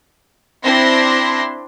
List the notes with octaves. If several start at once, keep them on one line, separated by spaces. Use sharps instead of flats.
C4 D4 E4 C6 A#6